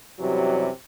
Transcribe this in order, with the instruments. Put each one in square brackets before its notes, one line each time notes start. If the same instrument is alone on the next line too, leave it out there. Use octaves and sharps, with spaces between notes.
[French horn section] F#2 C3 E3 F#3 G3 C#5